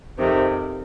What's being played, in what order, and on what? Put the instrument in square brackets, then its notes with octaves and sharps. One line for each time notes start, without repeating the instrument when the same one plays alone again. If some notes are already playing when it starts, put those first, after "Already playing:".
[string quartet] F2 C3 D#3